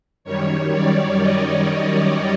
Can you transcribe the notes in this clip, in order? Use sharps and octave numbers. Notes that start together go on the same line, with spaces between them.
F#2 D#3 G3 C#5
D5
D#5